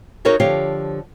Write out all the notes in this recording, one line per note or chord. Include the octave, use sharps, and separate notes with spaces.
D#4 F#4 G#4 A#4 C#5 E5
D3 F3 G4 C#5 F5